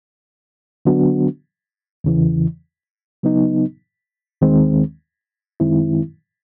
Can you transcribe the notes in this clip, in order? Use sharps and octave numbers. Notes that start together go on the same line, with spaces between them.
D3 F#3 B3 D4 F#4
E2 C#3 E3
C#3 F#3 B3 D#4
D#2 D#3 G#3 C4
F#2 D#3 G#3 C4 E4